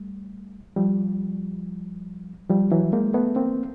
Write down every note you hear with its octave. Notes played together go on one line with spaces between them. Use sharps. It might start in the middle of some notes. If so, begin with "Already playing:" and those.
Already playing: G3 A3
F3 G3
F3 G3
E3 F#3
G#3 A#3
A3 B3
A#3 C4